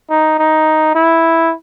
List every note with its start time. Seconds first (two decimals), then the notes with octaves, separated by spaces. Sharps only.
0.10 D#4
0.39 D#4
0.95 E4